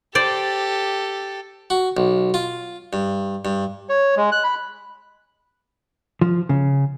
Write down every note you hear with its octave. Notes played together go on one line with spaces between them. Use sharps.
G4 A4 C5 D5
F#4
B1
F4
G2
G2
C#5
G#3
F#6
B5
F3
C#3